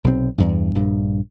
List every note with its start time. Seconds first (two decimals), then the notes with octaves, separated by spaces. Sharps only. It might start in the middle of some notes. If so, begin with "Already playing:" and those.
0.04 B1 C3 F3 C4
0.38 E2 G2
0.75 A#1 G2